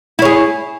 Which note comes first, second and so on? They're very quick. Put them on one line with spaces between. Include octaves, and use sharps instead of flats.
E4 C#5 G#4